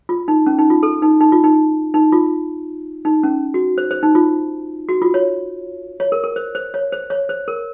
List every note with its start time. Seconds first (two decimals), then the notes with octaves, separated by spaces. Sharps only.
0.09 F4
0.28 D#4
0.47 C#4
0.58 D#4
0.70 F4
0.83 A4
1.02 D#4
1.21 D#4
1.32 F4
1.44 D#4
1.94 D#4
2.12 F4
3.05 D#4
3.23 C#4
3.54 F#4
3.78 C5
3.91 C5
4.03 D#4
4.15 F4
4.89 F#4
5.02 F4
5.14 C#5
6.00 C#5
6.12 A#4
6.24 A#4
6.36 C5
6.55 C5
6.74 C#5
6.92 C5
7.10 C#5
7.29 C5
7.48 A#4